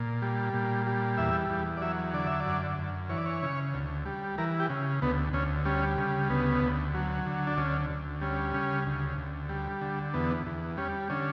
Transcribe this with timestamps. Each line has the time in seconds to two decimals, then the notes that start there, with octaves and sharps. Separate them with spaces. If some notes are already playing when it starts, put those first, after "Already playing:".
Already playing: A#2
0.22 G3
0.53 A#2
0.86 G3
1.18 E2 E5
1.50 E2
1.77 D5
1.81 F#3 E5
2.14 D3 D5
2.27 E5
2.40 D5
2.46 F#2
2.78 F#2
3.10 E3 C#5
3.17 D5
3.26 C#5
3.43 C#3
3.74 D2
4.06 G3
4.38 E3 A#4
4.60 G4
4.70 C#3
5.02 D2 B3
5.33 D2 C#4
5.65 G3 C#4
5.98 C#3
6.30 D2 B3
6.62 D2
6.94 F#3
7.26 D3
7.47 D4
7.57 D2 C#4
7.90 D2
8.21 G3 C#4
8.54 C#3
8.86 D2
9.18 D2
9.49 G3
9.81 D3
10.14 E2 B3
10.46 E2
10.77 G3 C#4
11.10 D3 C#4